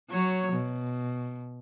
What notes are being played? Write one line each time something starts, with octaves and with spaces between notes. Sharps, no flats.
F#3 C#5
B2